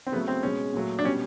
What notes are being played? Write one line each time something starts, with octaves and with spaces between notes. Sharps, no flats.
C4
C#3 F#3 A3 B3
C4
B2 G#3 C#4
A#2 F#3 A3
D4
B2 G3 C#4